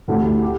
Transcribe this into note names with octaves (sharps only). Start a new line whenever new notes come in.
D2 D3 A3 E4 G4
G4